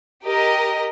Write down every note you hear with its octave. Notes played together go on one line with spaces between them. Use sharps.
G4 A#4 D#5